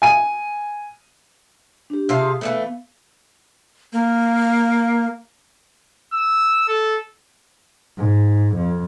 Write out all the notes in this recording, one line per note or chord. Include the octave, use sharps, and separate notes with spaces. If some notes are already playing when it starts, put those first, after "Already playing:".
G#5 D#7
D4 G4
C3 F4 E5 F5 A5
G#4 D#6
E3 G3 A3 B3 F5
A#3
E6
A4
G#2
F2